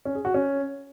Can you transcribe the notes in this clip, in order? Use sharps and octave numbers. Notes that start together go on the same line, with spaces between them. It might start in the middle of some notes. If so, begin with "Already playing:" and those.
C#4
G#4
F#4
C#4